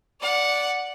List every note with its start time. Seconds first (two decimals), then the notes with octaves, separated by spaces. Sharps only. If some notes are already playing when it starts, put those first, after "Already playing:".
0.20 D5 F#5